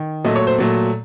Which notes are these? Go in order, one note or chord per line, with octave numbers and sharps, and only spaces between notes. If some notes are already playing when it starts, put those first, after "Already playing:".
Already playing: D#3
A#2 F#3 A3 D#5
C#5
C5
A#2 F#3 A3